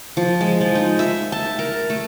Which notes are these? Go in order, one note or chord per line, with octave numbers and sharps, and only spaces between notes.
F3
G#3
F3
D#4
E5
A5
A#4
A3